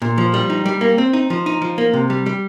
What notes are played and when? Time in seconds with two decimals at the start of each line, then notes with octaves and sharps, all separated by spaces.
0.02 A#2
0.18 F3
0.34 G3
0.50 D#4
0.66 G3
0.81 A#3
0.98 C4
1.13 D#4
1.30 F3
1.46 D#4
1.62 F3
1.78 A#3
1.94 C3
2.10 G3
2.26 G3